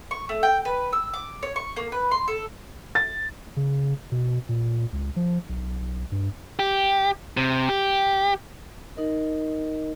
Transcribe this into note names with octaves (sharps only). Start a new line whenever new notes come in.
C#6
A3
G5
B4
E6
D6
C#5
C#6
A#3
B4
C6
A4
A6
C#3
B2
A#2
C#2
F3
B1
G2
G4
C3
G4
D#4 A#4 D#5